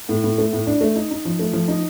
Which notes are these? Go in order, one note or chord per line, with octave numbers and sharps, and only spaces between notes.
A2
A2
A3
A2
D4
A3
D#4
D#4
F3
A3
F3
D#4